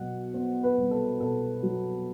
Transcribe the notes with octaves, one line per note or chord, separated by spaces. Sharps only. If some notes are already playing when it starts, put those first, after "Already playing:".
Already playing: B2 F#3 F#5
B3 C5
B4
C2
A4
B2 A4
F#3